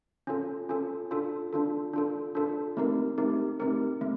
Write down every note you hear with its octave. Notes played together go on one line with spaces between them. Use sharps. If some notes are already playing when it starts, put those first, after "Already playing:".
C#4 F4 A4
C#4 F4 A4
D4 F4 A4
D4 F4 A4
D4 F4 A4
D4 F4 A4
A3 C4 D#4 G4 A#4
A3 C4 D#4 G4 A#4
A3 C4 D#4 G4 A#4
A3 C4